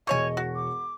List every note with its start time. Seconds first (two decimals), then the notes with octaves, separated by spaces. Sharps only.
0.07 E1 B2 C#5 D#5 G#5 C#6
0.37 F#4
0.55 D6